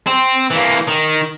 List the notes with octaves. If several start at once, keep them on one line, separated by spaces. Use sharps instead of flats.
C4
E3 A#3
D#3